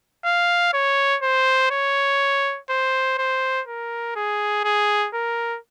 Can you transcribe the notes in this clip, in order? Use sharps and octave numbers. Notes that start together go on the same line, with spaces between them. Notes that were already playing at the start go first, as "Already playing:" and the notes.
F5
C#5
C5
C#5
C5
C5
A#4
G#4
G#4
A#4